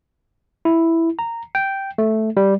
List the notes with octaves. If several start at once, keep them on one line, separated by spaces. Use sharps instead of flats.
E4
A#5
G5
A3
G3